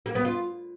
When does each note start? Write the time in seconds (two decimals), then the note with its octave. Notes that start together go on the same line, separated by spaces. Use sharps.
0.06 A#3
0.15 B3
0.25 F4